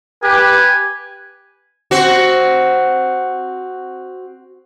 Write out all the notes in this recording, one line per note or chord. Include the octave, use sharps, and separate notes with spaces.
G4 B4 G#5
C4 F#4